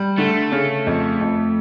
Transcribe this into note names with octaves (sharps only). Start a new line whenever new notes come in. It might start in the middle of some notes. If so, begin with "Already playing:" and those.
Already playing: G3
D3 A3
C#3
F2
F2